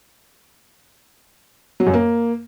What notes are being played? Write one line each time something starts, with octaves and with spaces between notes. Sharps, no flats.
F#3
F#2
A#3